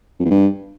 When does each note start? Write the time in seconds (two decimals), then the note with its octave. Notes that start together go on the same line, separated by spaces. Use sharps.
0.19 F2
0.25 E2
0.31 G2